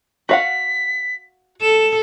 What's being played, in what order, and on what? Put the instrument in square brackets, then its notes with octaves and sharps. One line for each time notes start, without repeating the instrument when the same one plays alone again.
[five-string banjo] F#4 F5 F#5 [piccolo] B6
[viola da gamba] A4 [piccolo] E7